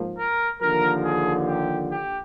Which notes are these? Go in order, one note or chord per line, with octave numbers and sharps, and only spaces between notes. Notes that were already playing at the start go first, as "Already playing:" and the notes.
Already playing: G#2 F3 A#3
A#4
D#2 D3 F3 A#4
G#4
G4
G4